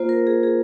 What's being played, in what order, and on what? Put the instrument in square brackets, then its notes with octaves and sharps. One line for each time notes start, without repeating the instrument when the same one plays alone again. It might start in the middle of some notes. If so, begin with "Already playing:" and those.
Already playing: [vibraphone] A#3 F4 C5
A#4
G#4
G#4